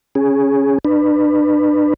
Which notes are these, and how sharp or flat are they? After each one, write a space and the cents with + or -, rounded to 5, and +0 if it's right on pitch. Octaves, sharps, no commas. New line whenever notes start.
C#4 +0 G#4 +0
D4 +35 B4 +0